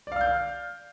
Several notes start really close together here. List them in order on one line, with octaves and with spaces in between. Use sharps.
D5 F5 F6 G6